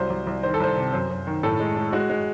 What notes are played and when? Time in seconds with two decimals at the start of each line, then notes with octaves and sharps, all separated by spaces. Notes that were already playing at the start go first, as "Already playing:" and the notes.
Already playing: C2 F#3 C5
0.10 C2
0.27 C2
0.43 D#3 C5
0.54 A4
0.60 C2 C5
0.77 C3
0.93 F#2 C5
1.10 F#2
1.27 D#3
1.43 A2 A4
1.60 G#3
1.77 G#3
1.92 G#3 F#4
2.10 G#3